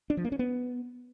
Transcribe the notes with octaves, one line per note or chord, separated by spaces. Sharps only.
D4
F3
A#3
C#4
B3